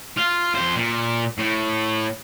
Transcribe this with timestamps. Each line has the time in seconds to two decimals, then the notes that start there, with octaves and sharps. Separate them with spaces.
0.18 F4
0.55 F2 C5
0.76 A#2
1.38 A2